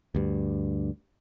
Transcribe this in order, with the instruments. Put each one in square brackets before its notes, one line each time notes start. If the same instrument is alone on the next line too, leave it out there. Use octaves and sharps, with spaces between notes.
[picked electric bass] D2 G2